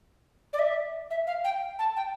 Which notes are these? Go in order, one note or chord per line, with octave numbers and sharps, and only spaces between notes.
D5
E5
E5
F5
G5
A5
G5